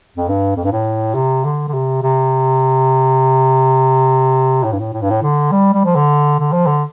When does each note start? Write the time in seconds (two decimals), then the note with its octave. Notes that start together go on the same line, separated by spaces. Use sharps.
0.16 F2
0.28 G2
0.56 F2
0.64 G2
0.72 A2
1.14 C3
1.45 D3
1.68 D3
1.73 C3
2.03 C3
4.64 A2
4.72 G2
4.79 A2
4.93 A2
5.02 G2
5.10 A2
5.22 D3
5.51 G3
5.73 G3
5.85 F3
5.96 D3
6.39 D3
6.52 F3
6.67 D3